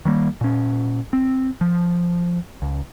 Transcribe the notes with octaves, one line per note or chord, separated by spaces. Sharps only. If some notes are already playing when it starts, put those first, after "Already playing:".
D#3 G3 A#3
A#2 C#4
C4
F3
C#2